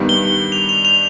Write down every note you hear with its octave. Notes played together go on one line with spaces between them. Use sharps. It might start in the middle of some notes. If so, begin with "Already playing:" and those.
Already playing: G2 D#3 G3 B3
G7
F7
F7
F7